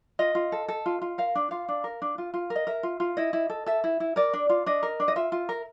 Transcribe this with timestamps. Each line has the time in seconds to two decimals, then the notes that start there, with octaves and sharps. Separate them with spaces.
0.19 F4 D#5
0.35 F4
0.52 A4
0.68 A4
0.86 F4
1.02 F4
1.18 A#4 F5
1.35 D4
1.51 F4 F5
1.68 D4
1.84 A#4
2.02 D4
2.18 F4
2.34 F4
2.50 A#4
2.56 D#5
2.67 A#4 E5
2.83 F4
3.00 F4
3.17 E4 D#5
3.33 E4
3.50 A4
3.66 A4 E5
3.84 E4
4.00 E4
4.16 A#4 D5
4.33 D4
4.49 F4
4.66 D4 D#5
4.83 A#4
5.00 D4
5.08 D#5
5.16 F4 E5
5.32 F4
5.49 A#4